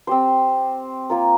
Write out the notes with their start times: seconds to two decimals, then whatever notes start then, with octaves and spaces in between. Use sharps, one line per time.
0.07 C4 G4 C5
1.10 A#3 F4 A#4